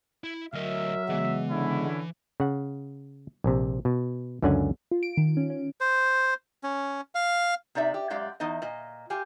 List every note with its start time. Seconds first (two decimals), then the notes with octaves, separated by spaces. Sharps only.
0.24 E4
0.53 D2 F#3 A#4 D#5 E5
1.09 C#3 E3 G#3 B3
1.50 D3 C#4 E4
2.40 C#3 F#5
3.44 A#1 C3
3.85 B2
4.42 C#2 F#2 D3 C#4 F#5 G#5
4.91 F4
5.03 D7
5.17 D#3
5.37 C#4
5.50 C#4
5.80 C5
6.63 C#4
7.15 F5
7.75 C3 D#4 D5 E5
7.94 G4
8.10 F#2 G#3 G4 D5 F5
8.40 E2 B3 D#4 D#5
8.62 A#2 D#5
9.10 F4 G4 G#5